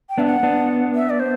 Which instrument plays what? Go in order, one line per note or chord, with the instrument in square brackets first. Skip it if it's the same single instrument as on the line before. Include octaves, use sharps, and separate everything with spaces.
[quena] G5
[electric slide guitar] B3 D4 [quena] E5
[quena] F#5
[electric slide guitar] B3 D4
[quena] E5
D5
C5